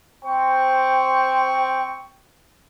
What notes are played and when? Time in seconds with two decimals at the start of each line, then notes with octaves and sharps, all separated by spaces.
0.25 C4 C5 G5 C#6